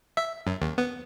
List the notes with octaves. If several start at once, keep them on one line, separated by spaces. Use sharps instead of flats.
E5
F#2
D#2
B3